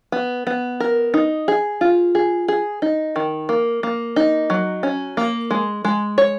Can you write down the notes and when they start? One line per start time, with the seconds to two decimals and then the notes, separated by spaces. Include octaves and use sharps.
0.12 B3
0.47 B3
0.80 A#4
1.14 D#4
1.48 G#4
1.81 F4
2.15 G#4
2.48 G#4
2.82 D#4
3.16 D#3
3.49 A#3
3.83 A#3
4.16 D#4
4.50 F#3
4.83 C#4
5.17 A#3
5.51 G#3
5.84 G#3
6.18 C#5